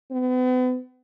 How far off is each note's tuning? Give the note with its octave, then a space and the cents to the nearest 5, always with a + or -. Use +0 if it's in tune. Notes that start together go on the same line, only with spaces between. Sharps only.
B3 +40